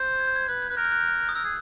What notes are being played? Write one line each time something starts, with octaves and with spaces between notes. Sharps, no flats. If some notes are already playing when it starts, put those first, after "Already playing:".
Already playing: C5
G#6
G6
G#6
B4 G#6
G6
B4
A#4 F#6
G6
F#6
G6
F#6
D#6
A#4 E6
G#4